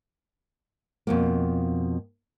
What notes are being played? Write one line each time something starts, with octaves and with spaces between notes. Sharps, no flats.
F2 B2 A#3